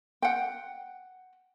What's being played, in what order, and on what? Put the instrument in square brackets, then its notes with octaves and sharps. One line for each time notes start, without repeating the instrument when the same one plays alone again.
[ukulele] F#5 G5